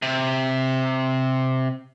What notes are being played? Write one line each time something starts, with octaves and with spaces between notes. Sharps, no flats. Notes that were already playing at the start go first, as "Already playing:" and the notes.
C3